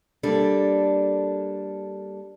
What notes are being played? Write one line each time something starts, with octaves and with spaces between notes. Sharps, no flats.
G3 A#3 D4 A4